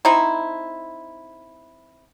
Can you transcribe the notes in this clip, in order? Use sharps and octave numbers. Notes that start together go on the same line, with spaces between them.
C4 D#4 E4